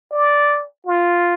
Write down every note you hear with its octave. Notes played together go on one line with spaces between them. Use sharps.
D5
F4